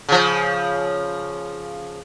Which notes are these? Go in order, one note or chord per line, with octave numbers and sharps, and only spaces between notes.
C#3 F3